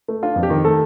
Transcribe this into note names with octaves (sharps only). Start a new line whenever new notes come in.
A3
D4 F4
F2
G4
D#3
A3 A4